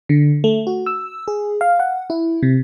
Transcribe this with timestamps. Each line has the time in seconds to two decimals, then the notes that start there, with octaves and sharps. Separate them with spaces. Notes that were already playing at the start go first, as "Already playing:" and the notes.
0.09 D3
0.44 A3
0.67 F#4
0.86 E6
1.28 G#4
1.61 F5
1.80 F#5
2.10 E4
2.43 C3